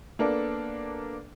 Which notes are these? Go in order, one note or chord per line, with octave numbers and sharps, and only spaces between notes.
A#3 B3 D4 A4